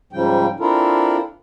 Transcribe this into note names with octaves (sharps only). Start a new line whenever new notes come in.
G#2 C#3 F3 G3 G5
C4 D4 E4 F4 A4 A#4